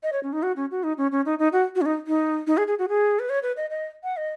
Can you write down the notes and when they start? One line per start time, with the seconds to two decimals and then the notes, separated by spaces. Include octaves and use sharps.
0.03 D#5
0.13 C#5
0.23 C#4
0.33 D#4
0.43 F#4
0.56 C#4
0.71 F#4
0.84 D#4
0.98 C#4
1.12 C#4
1.26 D#4
1.39 D#4
1.53 F#4
1.75 F#4
1.81 C#4
1.86 D#4
2.07 D#4
2.47 D#4
2.57 G#4
2.67 G#4
2.79 F#4
2.89 G#4
3.19 B4
3.30 C#5
3.43 B4
3.57 D#5
3.70 D#5
4.04 F#5
4.17 D#5